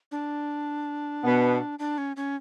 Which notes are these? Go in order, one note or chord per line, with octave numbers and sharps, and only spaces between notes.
D4
B2 B3
D4
C#4
C#4